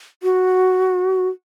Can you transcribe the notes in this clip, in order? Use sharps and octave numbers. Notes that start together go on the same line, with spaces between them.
F#4